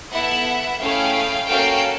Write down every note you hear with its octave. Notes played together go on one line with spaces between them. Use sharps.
B3 E4 A4 E5 F#5
A3 C#4 E4 G#4 F5 G5
A#3 C#4 F#4 A4 F5 G5